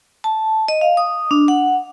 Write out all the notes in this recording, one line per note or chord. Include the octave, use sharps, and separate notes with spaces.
A5
D#5
F5
D#6
D4
F#5